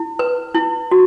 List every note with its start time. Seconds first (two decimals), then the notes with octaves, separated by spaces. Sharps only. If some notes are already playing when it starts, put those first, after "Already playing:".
Already playing: E4
0.19 B4
0.55 E4
0.91 F#4